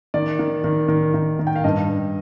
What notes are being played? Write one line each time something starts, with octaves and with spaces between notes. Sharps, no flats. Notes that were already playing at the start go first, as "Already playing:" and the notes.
D#3 D5
D#3
D#3
D#3
D#3
D#3
G5
F5
G2 D#5
G2